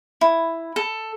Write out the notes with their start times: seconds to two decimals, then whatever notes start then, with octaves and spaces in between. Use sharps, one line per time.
0.21 E4
0.76 A4